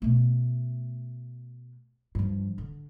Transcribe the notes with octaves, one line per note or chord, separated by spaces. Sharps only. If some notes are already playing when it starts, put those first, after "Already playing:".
B2 A3
G2 F3
D3